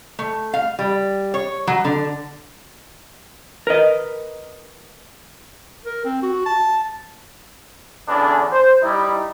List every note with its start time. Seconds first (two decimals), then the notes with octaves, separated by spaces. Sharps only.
0.19 A3
0.53 F5
0.79 G3
1.34 C#5
1.67 F#3
1.85 D3
3.67 A#4 B4 D#5
5.86 A#4
6.05 C4
6.23 F#4
6.46 A5
8.09 E2 D3 E3 C#4 D4
8.52 C5
8.83 G3 D#4 E4